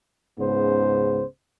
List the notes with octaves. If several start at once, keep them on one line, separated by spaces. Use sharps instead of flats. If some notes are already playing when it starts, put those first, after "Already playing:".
C#2 G#2 C#3 B3 C5